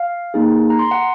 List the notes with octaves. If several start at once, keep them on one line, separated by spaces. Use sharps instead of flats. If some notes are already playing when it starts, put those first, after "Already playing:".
Already playing: F5
A#3 D#4 G#4
A#5
C6
F#5